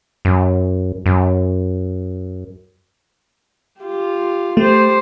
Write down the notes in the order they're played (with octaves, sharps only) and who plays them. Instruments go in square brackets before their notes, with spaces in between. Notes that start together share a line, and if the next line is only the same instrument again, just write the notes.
[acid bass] F#2
F#2
[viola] F4 G4
[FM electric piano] A3 [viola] G4 C5